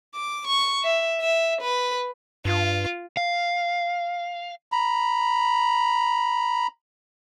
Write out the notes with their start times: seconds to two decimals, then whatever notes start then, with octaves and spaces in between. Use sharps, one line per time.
0.14 D6
0.47 C#6
0.83 E5
1.21 E5
1.61 B4
2.45 G2 F4
3.17 F5
4.72 A#5 B5